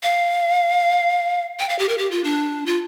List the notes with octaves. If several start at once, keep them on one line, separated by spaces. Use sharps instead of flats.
F5
G5
F5
G4
A#4
G4
F4
D4
F4